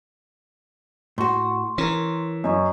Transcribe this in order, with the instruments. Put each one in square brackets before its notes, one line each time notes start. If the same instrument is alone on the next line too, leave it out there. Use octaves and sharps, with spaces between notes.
[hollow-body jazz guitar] A2 F#4 [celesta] C6 C#6
[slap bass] E3 [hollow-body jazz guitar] C#4 A#4
[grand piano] F#2 [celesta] D#5 A#5 C#6